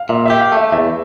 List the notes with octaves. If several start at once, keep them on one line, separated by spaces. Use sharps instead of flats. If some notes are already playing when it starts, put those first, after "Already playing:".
Already playing: F5
A#2 E5
G4 E5
F5
A3 E5
E2 E5